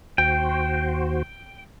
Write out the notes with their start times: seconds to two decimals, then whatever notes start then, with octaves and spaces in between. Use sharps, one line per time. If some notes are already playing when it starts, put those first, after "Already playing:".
0.18 D#2 F#4 C5 G5